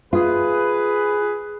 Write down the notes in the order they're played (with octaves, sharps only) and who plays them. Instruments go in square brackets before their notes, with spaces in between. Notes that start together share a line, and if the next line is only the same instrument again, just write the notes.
[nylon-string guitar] F4 [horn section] G#4 B4